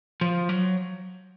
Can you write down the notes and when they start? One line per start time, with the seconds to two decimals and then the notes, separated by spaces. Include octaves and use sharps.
0.21 F3
0.49 F#3